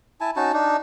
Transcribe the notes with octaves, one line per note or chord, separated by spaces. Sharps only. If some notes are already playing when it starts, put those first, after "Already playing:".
E4 G#5 A5
C#4 D#4 F#4 A5
D4 D#4